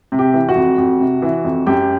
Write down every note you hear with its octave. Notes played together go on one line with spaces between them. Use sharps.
C3
G4
E3
F#4
F2
F2
C3
E3
F2
F#2 G4